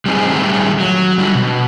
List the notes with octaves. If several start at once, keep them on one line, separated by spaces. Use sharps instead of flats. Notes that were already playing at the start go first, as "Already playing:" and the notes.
G3 A3 C4 D#4 G#4
D#3 G3 A3 G#4
F#3
D3 G3
B2